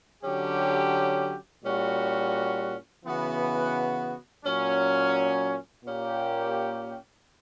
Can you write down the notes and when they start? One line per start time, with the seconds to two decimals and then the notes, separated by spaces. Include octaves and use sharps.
0.23 D3 F#3 C#4 G4
1.64 A#2 G3 C#4 F#4
3.04 C#3 E3 B3 F#4
4.45 A#2 F#3 C#4
5.85 A#2 A#3 C#4 G4